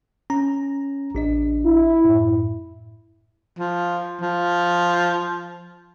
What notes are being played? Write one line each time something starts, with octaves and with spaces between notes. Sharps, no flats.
C#4 A#5
A1 D4 D#5
E4
F#2 A2
F3
F3